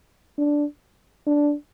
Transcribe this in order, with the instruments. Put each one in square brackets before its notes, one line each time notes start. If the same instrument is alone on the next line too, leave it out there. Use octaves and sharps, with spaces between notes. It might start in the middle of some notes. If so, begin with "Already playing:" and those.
[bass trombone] D4
D4